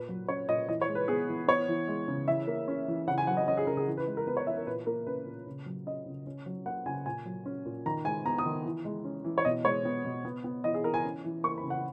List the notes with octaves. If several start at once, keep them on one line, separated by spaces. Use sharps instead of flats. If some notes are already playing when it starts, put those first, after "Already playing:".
Already playing: A#2 B4
F#3
C#4 C#5
A#2 D#5
E3 D#5
C#5
G#3
B4
B3 G#4
E3
B3 C#5
E3
G#3
C#3
E3 E5
A#3
C#4
E3
C#3 F#5
G#5
F#3 F#5
D#5
C#4 D#5
G#4
C#3 A#4
G#4
E3
B4
G#3
A#4
B3 B4
C#5
E3 E5
A#4
A#2 B4
A#3 A#4
C#4 B4
A#2
C#3
F#3
C#4 D#5
C#3
C#4
F#3
A#3 F#5
C#3 G#5
A#2 G#5
F#3
C#4
A#2
D#3 A#5
G#3 G#5
B3 A#5
D#6
D#3
E3
G#3
C#4
E3
C#5
B2 D#5
G#3 C#5
B3
B2
B3
B3
E3 D#5
G#4
E3 A#4
G#5
C#4
E3
A#3 C#6
B5
C#3
F#5